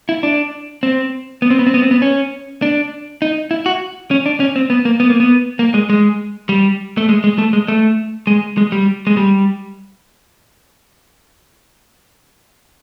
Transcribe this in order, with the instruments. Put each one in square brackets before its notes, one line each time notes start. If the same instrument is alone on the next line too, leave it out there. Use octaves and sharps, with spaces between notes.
[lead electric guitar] E4
D4
C4
B3
C4
B3
C4
B3
C4
B3
C#4
D4
D#4
E4
F#4
C#4
D4
C#4
C4
B3
A#3
B3
A#3
B3
A#3
G#3
G#3
G3
A3
G#3
G#3
A3
G#3
A3
G#3
G#3
G3
G#3
G3